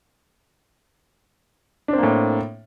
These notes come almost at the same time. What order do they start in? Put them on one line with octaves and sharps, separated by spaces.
D4 C4 A#3 A2